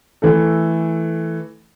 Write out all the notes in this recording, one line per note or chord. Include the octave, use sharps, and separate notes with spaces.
E3 A3 A4